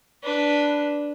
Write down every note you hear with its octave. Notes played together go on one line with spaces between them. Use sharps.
D4 B4